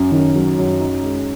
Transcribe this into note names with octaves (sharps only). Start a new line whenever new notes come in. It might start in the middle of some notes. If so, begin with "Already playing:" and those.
Already playing: F#2 C#4
D#3
F#3
F#2
D#4
G#3